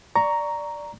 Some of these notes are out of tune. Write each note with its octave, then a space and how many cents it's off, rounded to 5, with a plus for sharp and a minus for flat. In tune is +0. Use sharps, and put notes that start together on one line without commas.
D5 +0 A#5 +0 C#6 +10